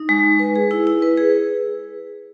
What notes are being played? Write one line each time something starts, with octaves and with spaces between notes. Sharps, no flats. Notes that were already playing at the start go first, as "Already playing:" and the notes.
Already playing: D#4
G#3
G#3
B4
G#4
E4
E4
B4
G#4